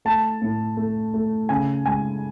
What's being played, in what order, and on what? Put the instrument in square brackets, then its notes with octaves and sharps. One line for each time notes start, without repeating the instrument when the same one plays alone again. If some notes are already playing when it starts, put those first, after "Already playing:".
[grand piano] A3 A5
A2
A3
A3
C#3 G#5
G#3 G#5